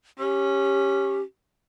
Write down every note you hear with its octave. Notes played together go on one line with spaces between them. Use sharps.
C#4 G4